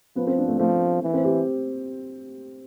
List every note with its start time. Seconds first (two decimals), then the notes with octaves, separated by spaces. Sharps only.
0.16 F3 B3
0.27 C4
0.38 D4
0.48 A3
0.59 F3 A3
1.03 E3
1.14 C4
1.24 G4